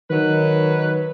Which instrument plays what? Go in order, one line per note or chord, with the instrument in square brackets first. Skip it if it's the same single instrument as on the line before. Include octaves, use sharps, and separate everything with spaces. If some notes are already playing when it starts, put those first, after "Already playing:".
[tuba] D#3 [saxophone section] F#3 B4